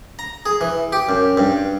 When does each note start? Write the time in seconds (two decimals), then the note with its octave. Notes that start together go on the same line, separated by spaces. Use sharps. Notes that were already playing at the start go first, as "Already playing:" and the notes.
0.19 A#5
0.46 G#4
0.61 E3
0.93 G4
1.09 F#2
1.37 G2